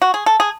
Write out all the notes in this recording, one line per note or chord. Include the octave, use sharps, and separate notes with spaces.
F#4
G#4
A4
G#4